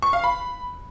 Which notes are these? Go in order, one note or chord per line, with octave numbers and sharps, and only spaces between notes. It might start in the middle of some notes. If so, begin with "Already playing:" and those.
C#6
F5
B5